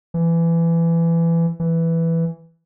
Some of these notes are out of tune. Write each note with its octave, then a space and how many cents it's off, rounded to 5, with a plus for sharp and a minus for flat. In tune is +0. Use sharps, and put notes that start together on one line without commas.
E3 +20
E3 +5